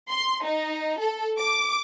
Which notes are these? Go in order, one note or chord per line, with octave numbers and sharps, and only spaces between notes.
C6
D#4
A4
D6